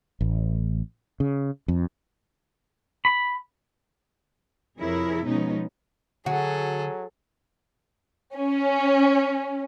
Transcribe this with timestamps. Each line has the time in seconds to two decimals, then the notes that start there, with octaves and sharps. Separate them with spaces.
0.21 A1
1.20 C#3
1.68 F2
3.05 B5
4.78 F2 C3 E4 G#4 A#4 C#5
5.26 B2 F3 G#3 B3 C#4 D#4
6.26 D3 F#3 F#4 G#4 A4
8.35 C#4